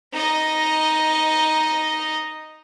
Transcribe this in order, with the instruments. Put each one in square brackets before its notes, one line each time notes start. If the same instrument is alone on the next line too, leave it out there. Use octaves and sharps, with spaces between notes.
[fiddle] D#4 D#5